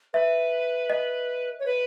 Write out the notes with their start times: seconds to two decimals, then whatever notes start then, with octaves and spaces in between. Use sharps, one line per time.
0.14 B4 E5
0.90 D#5
1.59 C#5
1.66 B4